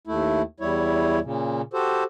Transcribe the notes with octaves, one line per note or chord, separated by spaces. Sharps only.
D#2 A3 E4
E2 G3 E4 C#5
A#2 C#3
F#4 G4 A4 C5